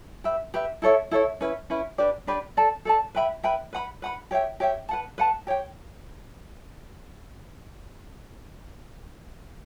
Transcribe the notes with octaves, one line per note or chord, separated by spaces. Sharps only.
G4 B4 E5
G4 B4 E5
E4 A4 C#5 E5
E4 A4 C#5 E5
C#4 E4 B4
C#4 E4 B4
D4 G4 B4 D5
D4 G4 B4 D5
A4 D5 A5
A4 D5 A5
B4 E5 G5 B5
B4 E5 G5 B5
B4 F#5 B5
B4 F#5 B5
G4 C#5 E5 G5
G4 C#5 E5 G5
B4 F#5 A5
B4 F#5 A5
G4 C#5 G5